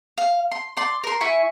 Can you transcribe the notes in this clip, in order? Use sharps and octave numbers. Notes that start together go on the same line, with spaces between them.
F5
C6
D5 C6
A#4 C6
E4 E5 G#5 C#6